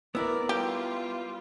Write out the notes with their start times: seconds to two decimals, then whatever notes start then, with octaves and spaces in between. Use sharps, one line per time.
0.15 B3 E4 A#4 D5 E6
0.49 G3 F4 G4